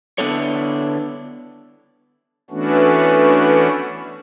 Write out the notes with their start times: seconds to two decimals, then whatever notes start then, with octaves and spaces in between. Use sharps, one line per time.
0.18 D3 B3 D4 E4 A4 C#5
2.50 E3 A3 B3 C#4 D4 F#4